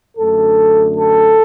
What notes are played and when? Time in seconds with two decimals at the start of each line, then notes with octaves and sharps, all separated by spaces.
0.18 F#2 D3 A3 A4
0.95 A4